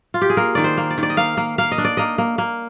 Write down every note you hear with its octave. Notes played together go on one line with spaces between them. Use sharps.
F4
G4
G#4
A#3 A#4
D#3 D5
C5
A#3
D5
D#3
D5
D#5
A#3 F5
A#3
A#3 F5
D#5
D4
D5
A#3 D#5
A#3
A#3